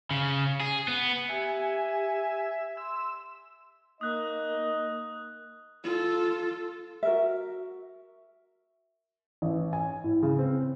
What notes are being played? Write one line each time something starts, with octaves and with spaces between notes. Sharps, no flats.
C#3
G#4
B3
G4 E5 G#5
C6 E6
A#3 D#4 D#5 D#6 F#6
F4 A4
F#4 A#4 E5
A1
G#5
A2
C#3
C4